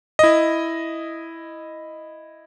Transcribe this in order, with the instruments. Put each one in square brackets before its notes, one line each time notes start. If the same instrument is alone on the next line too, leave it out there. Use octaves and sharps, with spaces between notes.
[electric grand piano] E4 D#5